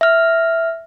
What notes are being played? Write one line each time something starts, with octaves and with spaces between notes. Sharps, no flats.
E5 F6